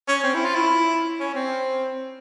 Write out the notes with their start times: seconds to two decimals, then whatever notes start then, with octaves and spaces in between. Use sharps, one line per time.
0.08 C#4
0.24 C4
0.34 E4
0.45 F4
0.55 E4
1.20 C#4
1.34 C4